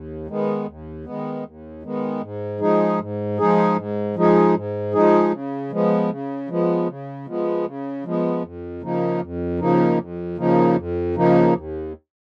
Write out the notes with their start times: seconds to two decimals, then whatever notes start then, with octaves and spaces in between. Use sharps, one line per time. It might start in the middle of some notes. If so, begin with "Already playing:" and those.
Already playing: D#2
0.27 D#3 G#3 B3
0.66 D#2
1.05 D#3 G#3 B3
1.44 D#2
1.83 D#3 G#3 B3
2.21 G#2
2.60 F3 G#3 D#4 G#4
2.99 G#2
3.38 F3 G#3 D#4 G#4
3.76 G#2
4.16 F3 G#3 D#4 G#4
4.55 G#2
4.93 F3 G#3 D#4 G#4
5.32 C#3
5.71 F3 G#3 B3
6.10 C#3
6.49 F3 G#3 B3
6.87 C#3
7.26 F3 G#3 B3
7.65 C#3
8.04 F3 G#3 B3
8.43 F2
8.82 C#3 F3 A#3 D#4
9.21 F2
9.60 C#3 F3 A#3 D#4
9.98 F2
10.37 C#3 F3 A#3 D#4
10.76 F2
11.15 C#3 F3 A#3 D#4
11.54 D#2